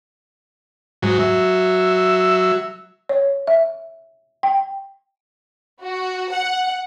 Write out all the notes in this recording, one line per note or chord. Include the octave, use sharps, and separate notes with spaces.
G#2 F#3
F#3 E5
C#5
E5
G5
F#4
F#5